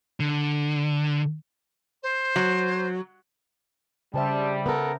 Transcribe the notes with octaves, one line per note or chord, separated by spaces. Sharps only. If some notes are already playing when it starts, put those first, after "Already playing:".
D3
C5
F#3
C#3 G3 C5 E5 A5
B3 A4 A#4